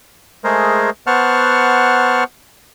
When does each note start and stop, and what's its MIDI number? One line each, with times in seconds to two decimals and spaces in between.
0.44 0.90 56
0.44 0.90 57
0.44 0.90 68
0.44 0.90 70
0.44 0.90 72
1.07 2.24 59
1.07 2.24 72
1.07 2.24 78
1.07 2.24 81
1.07 2.24 85
1.07 2.24 89